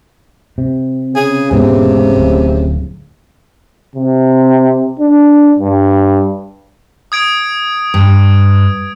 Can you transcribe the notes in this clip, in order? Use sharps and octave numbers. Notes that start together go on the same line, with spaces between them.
C3
C#3 G#4
E1 G#2 C3 B3
D1 A2
C3
D4
G2
D#6 G#6 D7
G2